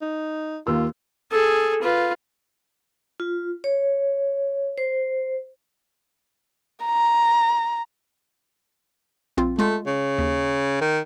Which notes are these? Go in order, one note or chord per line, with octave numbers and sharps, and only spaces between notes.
D#4
D#2 A#3 F4 E6
G#4 A4
F4 B4
F4
C#5
C5
A#5
A#1 C4 F4
G#3 A3 F4
C#3
D#2
D#3